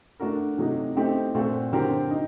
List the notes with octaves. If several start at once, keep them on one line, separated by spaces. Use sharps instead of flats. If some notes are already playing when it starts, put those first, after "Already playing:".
A3 D4 F#4 A#4
C3 F#3 A3 D#4
A3 C4 D#4 G4
A#2 A3 C4 F#4 A4
D3 F#3 C4 G4 A#4
D#4